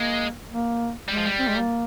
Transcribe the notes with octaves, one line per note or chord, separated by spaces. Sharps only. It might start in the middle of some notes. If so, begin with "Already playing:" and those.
Already playing: G#3 A#3
A#3
G3 G#3
F3
G3
C4
G#3
A#3